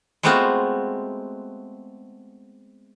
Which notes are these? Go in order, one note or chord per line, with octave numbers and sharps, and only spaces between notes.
G#3 A3 B3 C4 F4 F#4